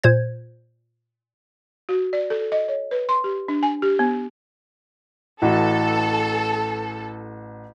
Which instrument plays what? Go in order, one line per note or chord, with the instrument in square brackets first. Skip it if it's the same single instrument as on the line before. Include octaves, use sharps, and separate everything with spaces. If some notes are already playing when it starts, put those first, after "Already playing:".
[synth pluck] A#2 C5 G#6
[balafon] F#4
D5
A4
D#5
C#5
B4
C6
G4
D4
G#5
G4
B3
[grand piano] A1 E3 F#4 [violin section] A4